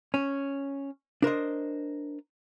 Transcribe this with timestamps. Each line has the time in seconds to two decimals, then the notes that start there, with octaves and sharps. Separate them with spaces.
0.14 C#4
1.22 D4 A#4 C5 D#5